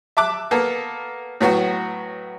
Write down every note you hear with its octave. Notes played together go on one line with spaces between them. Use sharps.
E5 A5 D6 F#6
A#3 B3 A4
A2 F#3 B3 F#4